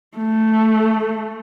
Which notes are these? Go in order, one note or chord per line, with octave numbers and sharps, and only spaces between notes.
A3